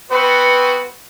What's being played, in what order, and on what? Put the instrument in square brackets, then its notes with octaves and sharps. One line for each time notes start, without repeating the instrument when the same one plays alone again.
[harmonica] B3 C4 F#4 [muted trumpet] B4